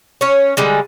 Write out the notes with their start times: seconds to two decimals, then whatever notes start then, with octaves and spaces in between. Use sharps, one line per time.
0.21 C#4 C#5
0.57 D3 G3 G#3